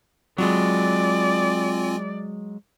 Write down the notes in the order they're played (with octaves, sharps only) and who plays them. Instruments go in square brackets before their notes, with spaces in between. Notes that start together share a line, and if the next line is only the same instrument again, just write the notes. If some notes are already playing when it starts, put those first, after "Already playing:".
[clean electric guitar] F#3 G#3 [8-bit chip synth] C4 F4 G#5 [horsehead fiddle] D5